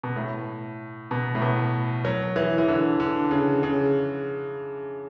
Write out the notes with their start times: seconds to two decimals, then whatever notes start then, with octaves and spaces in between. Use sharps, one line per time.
0.04 B2
0.16 A2
1.11 B2
1.35 A2
1.42 B2
2.05 F#3
2.36 E3
2.58 E3
2.68 D3
3.00 D3
3.31 C#3
3.63 C#3